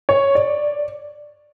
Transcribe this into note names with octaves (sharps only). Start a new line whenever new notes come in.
C#5
D5